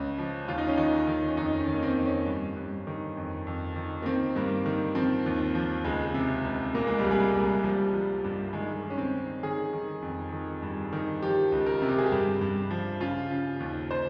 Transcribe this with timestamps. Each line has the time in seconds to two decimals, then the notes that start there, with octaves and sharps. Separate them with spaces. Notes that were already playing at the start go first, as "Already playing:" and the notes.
Already playing: C#2 C#3 C#4
0.18 F3
0.48 D#2 F4
0.58 D#4
0.67 C#4
0.77 D#3 D#4
1.07 D#3
1.28 C#4
1.37 F2 D#4
1.60 C#4
1.67 D#3
1.74 A#3
1.83 C4
1.98 F2
2.05 C#4
2.27 G2
2.56 G2
2.87 D#3
3.17 F2
3.47 F2
3.76 D#3
4.02 A#3
4.06 D#3 C4
4.36 G2 A#3
4.66 D#3
4.95 F3 C4
5.26 D#2
5.55 F3
5.84 C#2 G#3
6.14 C3
6.44 C#2
6.74 A#2 A#3
6.87 G#3
6.98 G3
7.05 C2
7.11 G#3
7.35 C2
7.63 F3 G3
7.93 F3
8.24 G2
8.53 D#3 G#3
8.83 D#3
8.90 C#4
8.98 C4
9.13 D#3
9.43 D#3 G#4
9.73 D#3
10.02 F2
10.32 D#3
10.62 G2
10.93 D#3
11.22 F3 G4
11.52 C#2
11.66 A#4
11.82 C3
11.89 G4
11.98 G#4
12.06 G4
12.12 G2
12.41 G2
12.71 F3
13.00 C#3 F4
13.31 C#3
13.60 D#2
13.91 C5